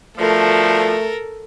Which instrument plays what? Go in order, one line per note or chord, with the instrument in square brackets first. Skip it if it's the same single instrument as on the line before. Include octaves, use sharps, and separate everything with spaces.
[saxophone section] B2 D3 F3 [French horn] A3 [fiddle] A4 A#4